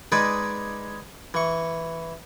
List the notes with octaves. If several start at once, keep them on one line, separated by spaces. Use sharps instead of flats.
G#3 D#4 B4 D5 G#5 D6
E3 C#6